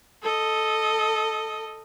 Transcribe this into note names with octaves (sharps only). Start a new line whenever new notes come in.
A4 D#5